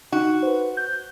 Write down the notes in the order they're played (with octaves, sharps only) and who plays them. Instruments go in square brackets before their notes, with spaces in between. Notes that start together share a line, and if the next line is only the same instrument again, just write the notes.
[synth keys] D#4 [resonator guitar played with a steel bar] F#4
[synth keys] B4 C5
G6